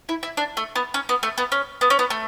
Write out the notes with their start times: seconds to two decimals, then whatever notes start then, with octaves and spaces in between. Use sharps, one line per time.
0.09 E4
0.23 E4
0.37 D4
0.57 A3
0.75 B3
0.94 C#4
1.09 B3
1.23 A3
1.38 B3
1.52 C#4
1.81 B3
1.90 C#4
1.99 B3
2.10 A3